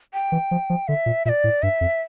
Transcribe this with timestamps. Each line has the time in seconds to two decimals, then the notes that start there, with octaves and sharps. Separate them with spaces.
0.13 G5
0.32 E3
0.51 F3
0.70 F3
0.88 D3 E5
1.06 A#2
1.25 A#2 E5
1.29 D5
1.44 A2
1.62 G2 E5
1.81 F2